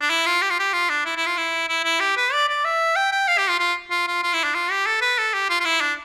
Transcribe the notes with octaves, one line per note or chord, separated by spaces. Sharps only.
D4
E4
F4
G4
F4
G4
F4
D4
E4
E4
F4
E4
E4
E4
G4
B4
D5
D5
E5
G5
G5
F5
G4
F4
F4
F4
F4
F4
E4
D4
F4
G4
A4
B4
A4
G4
F4
F4
E4
D4